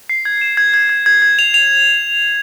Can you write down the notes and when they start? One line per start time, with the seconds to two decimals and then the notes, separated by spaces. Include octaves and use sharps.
0.09 C7
0.25 G#6
0.41 E7
0.57 G#6
0.74 G#6
0.89 G#6
1.06 G#6
1.22 G#6
1.39 F7
1.54 F7